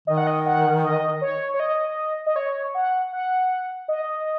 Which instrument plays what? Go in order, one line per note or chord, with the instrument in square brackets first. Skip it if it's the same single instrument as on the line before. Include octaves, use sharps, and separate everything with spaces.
[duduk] D#3 [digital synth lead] D#5
[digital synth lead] F#5
D#5
F#5
D#5
C#5
C#5
D#5
D#5
C#5
F#5
F#5
D#5